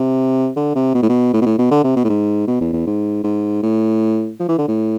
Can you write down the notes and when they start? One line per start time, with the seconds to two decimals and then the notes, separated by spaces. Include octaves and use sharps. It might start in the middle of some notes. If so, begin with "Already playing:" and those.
Already playing: C3
0.56 D3
0.75 C3
0.95 B2
1.03 A2
1.09 B2
1.33 A2
1.41 B2
1.46 A2
1.59 B2
1.71 D3
1.84 C3
1.96 B2
2.04 A2
2.09 G#2
2.47 B2
2.61 E2
2.73 E2
2.87 G#2
3.24 G#2
3.63 A2
4.40 F3
4.49 E3
4.58 D3
4.68 A2